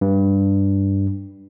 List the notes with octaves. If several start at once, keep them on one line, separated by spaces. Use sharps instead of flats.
G2